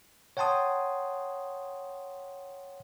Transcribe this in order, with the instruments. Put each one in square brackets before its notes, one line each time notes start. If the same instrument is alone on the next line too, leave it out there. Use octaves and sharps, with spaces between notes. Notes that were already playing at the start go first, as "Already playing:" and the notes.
[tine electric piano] C#5 F#5 G5 A5 C6 D#6